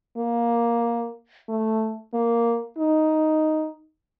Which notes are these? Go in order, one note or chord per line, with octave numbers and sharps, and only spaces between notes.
A#3
A3
A#3
D#4